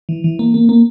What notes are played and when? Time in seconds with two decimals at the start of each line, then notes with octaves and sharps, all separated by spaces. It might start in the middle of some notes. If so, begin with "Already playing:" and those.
0.09 E3
0.24 E3
0.39 A#3
0.54 A#3
0.69 A#3